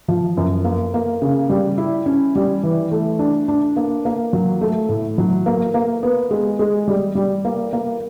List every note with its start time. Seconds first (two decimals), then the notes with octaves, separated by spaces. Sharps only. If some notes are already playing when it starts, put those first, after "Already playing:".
0.08 F3
0.37 F#2
0.64 A#3
0.94 A#3
1.22 C#3
1.50 G3
1.78 E4
2.06 C#4
2.35 G3
2.63 E3
2.91 A3
3.19 D4
3.48 D4
3.76 A#3
4.05 A#3
4.33 F#3
4.61 A3
4.89 A2
5.18 F#3
5.46 A#3
5.74 A#3
6.03 B3
6.31 G#3
6.59 G#3
6.88 G3
7.15 G3
7.45 A#3
7.73 A#3